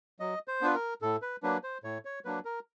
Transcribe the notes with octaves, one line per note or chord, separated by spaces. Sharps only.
F#3 D#5
C5
B3 D4 F4 B4
A#4
A2 A4
B4
F#3 A#3 D4 B4
C5
A2 C#5
C#5
F#3 A#3 D4 B4
A#4